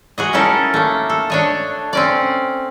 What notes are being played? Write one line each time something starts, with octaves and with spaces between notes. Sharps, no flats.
F#4 G#4 D#5
C#4 D#4 E4 A4 A#4
A3 A#3
A4
D4 C#5 D#5
C4 C#4 D5